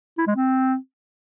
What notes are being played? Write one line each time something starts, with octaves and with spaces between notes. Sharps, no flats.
E4
G#3
C4